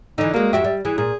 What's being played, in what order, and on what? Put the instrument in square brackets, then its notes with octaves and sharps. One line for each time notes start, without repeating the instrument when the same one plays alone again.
[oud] D3 E3 [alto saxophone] D#4
[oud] F#3 G#3 [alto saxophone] A#3
[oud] F2 F#4 G4 [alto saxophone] E5
[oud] G3
[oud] E3 [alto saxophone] G#4
[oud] A#2 [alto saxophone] G#4